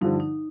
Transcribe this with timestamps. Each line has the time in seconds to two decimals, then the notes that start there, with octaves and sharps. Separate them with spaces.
0.01 G2 D3 F3 D#4
0.20 D#4